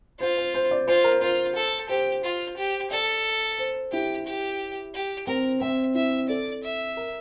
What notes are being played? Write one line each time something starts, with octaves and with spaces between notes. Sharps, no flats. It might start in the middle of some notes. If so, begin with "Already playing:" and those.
F4 C5
C5
C5
D5
F4 C5
A#4
F4 C5
A4
G4 C5
F4
G4
A4 D5
C5
E4 G4
G4
G4
C4 A#4
C4 E5
E4 E5
A4 D5
E5
A#4